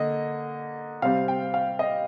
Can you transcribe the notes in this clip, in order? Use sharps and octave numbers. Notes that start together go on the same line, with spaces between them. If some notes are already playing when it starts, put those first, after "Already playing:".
Already playing: D3 A#3 D#5
C3 G3 C4 F5
G5
F5
D#5